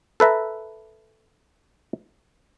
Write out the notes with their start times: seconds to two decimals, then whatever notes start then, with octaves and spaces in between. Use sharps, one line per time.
0.20 A4 B4 E5 A#5